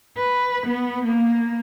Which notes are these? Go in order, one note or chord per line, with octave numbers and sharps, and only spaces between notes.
B4
B3
A#3